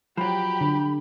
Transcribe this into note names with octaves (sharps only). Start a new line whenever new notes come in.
F3 F#3 G4 B5
D3